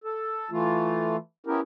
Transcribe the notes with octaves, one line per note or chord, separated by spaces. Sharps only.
A4
E3 A3 F4
B3 C#4 E4 G4 A#4